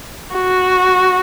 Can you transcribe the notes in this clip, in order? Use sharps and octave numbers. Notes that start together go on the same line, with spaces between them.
F#4